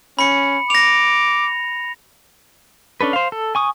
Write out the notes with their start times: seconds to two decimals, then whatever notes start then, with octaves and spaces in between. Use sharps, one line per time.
0.19 C#4 B5 C#7
0.70 D6 A#6 F7
3.01 C#4 D4 A4 B4
3.13 C5 F5
3.32 A4
3.55 G#5 C#6 D#6